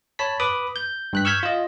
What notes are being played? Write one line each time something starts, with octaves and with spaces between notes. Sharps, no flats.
C#5 A5 B5 B6
B4 B5 D6 D#6
G6
G2 F#6 B6
C#6 E6 F6 G6 G#6 B6
F4 D#5